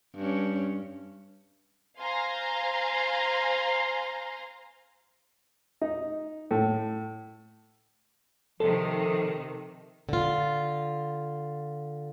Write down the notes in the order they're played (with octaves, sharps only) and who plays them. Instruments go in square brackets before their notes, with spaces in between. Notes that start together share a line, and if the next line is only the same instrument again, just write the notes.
[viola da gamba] G2 C#4
[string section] C5 F5 G#5 A#5 C6
[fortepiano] D#4
A2
[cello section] C3 D#3 [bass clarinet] F3 [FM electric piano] A4
[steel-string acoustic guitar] D3 F4